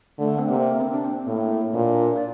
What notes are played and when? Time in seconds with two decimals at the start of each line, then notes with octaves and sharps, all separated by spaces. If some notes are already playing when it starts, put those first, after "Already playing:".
0.18 D3 A3
0.39 C4
0.49 C3 A#3
0.81 C4
0.92 D4
1.05 C4
1.27 A2 A#3
1.74 A#2 D4
2.16 D5